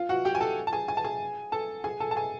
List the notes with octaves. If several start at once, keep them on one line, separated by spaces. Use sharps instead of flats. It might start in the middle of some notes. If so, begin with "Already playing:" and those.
Already playing: F4 F5
F#4 F#5
G4 G5
G#5
A4 A5
A5
G#4 G#5
G#5
A5
G#4 G#5
A4 A5
G#4 G#5
A4 A5
A5
G#4 G#5